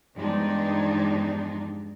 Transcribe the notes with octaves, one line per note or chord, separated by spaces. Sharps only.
E2 G2 F3 G#3 D4 D#4